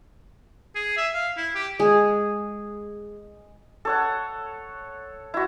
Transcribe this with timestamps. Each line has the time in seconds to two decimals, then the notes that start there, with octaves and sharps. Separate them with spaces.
0.75 G#4
0.97 E5
1.14 F5
1.37 E4
1.55 G4
1.79 G#3 G#4
3.85 A4 C#5 F#5
5.34 E4 F#4